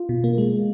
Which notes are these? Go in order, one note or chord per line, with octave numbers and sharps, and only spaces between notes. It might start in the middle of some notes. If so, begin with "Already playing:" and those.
Already playing: F4
B2
A#3
G#3